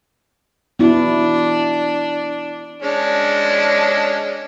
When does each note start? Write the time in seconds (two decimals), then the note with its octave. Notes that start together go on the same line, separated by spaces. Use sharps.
0.79 B3 D4 E4 F#4
2.82 G#3 C#4 D4